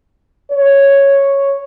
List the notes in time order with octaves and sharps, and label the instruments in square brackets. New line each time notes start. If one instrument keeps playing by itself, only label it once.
[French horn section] C#5